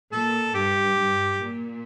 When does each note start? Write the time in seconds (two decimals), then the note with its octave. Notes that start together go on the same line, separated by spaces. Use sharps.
0.12 A#2 A4
0.55 G2 G4
0.98 G2
1.41 A#2